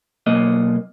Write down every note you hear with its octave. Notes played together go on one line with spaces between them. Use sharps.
B1 A#3 D#5